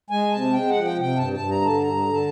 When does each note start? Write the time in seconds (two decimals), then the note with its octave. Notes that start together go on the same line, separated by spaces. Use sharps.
0.10 G#3 G#5
0.32 C3 A5
0.53 G#3 G5
0.69 F#5
0.75 F3
0.85 G5
0.96 C3 G5
1.17 G2 A5
1.33 A5
1.40 G2
1.50 A#5
1.61 D3 A5
1.82 G2 A#5
2.03 D3
2.13 A5